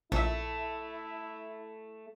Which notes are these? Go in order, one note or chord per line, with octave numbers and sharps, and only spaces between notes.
A#1 A3 E4 E5